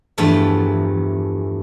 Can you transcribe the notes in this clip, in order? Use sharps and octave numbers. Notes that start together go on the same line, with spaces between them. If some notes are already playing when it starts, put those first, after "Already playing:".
E2 G2 F3 A3 E5